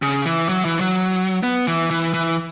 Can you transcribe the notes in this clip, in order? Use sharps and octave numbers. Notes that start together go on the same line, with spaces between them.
C#3
E3
F#3
E3
F#3
B3
E3
E3
E3